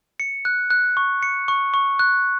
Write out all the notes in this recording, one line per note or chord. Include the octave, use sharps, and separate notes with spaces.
C#7
F#6
F#6
C#6
C#7
C#6
C#6
F#6